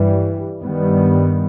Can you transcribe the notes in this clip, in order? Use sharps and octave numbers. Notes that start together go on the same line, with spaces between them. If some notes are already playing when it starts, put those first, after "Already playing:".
Already playing: G2 E3 G3
G2 D#3 G3 B3